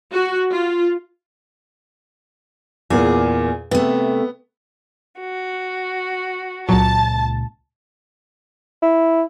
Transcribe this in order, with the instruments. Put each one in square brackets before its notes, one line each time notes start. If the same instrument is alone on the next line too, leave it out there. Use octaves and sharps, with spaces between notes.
[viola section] F#4
F4
[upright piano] E2 A#2 A#3 [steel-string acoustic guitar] G#4
[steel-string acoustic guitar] C3 A3 [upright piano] B3
[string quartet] F#4
[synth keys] C#2 A#2 [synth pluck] F#3 [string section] A5
[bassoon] E4